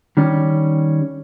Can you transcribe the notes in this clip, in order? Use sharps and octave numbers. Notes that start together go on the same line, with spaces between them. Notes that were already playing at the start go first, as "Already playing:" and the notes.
D#3 G3 C#4